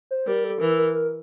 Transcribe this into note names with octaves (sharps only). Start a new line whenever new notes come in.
C5
G3 A#4
A4
E3 A#4
A#4
A#4